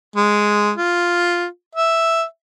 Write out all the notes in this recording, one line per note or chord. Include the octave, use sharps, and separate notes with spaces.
G#3
F4
E5